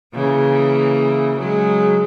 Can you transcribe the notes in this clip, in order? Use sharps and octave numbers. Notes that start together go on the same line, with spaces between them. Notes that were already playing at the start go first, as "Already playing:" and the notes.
C#3 E3 A#3
C#3 F#3 G#3